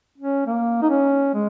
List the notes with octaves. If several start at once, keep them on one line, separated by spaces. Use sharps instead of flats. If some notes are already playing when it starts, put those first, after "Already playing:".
C#4
A#3
D#4
C#4
G#3